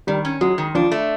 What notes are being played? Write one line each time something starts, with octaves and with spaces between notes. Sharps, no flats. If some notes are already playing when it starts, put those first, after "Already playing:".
D#3 G3
C#4
F#3 G#3
D#3
F3 D4
A3